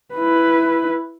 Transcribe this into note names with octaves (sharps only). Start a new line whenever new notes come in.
E4 B4